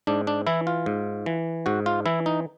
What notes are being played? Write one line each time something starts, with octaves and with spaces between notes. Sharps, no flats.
G#2 D4
D4
E3 E4
F4
G#2
E3
G#2 F#4
F4
E3 E4
D#4